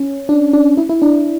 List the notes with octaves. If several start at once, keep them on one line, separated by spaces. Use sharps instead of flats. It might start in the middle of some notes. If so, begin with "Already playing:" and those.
Already playing: C#4
D4
D4
E4
E4
D4